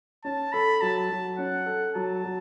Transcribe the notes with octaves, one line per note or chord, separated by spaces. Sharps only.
C#4 A5
A4 B5
F#3 A5
F#3
C#4 F#5
A4
F#3 A5
F#3